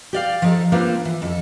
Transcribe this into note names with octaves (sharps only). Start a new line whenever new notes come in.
G4 D5 F5
F3 D#4 A4
A#3 C4 D4 F4 B4 C5
E3
F2 A4